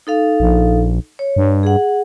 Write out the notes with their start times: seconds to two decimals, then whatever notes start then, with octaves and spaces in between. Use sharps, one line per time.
0.07 D#4 A4 F5
0.40 A#1
1.19 C#5
1.36 G2
1.63 G#4 F#5